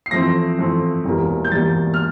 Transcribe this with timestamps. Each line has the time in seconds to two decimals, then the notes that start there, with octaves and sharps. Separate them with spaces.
0.06 C7
0.11 F2 E3 A3 C4 A#6
0.59 F2 E3 A3 C4
1.05 E1 E2 E3 G3 A#3
1.45 G6
1.52 E1 E2 E3 G3 A#3 A6
1.94 F6